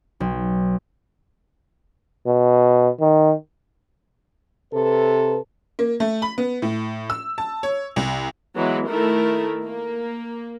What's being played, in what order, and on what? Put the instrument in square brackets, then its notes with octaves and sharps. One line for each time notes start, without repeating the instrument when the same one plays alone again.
[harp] B1
[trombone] B2
D#3
[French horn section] C3 A4 B4
[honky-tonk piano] A#3
A3
B5
B3
A2
E6
A5
C#5
C2
[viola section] E3 F#3 G#3 B3
D#3 A3 E4 A#4
A#3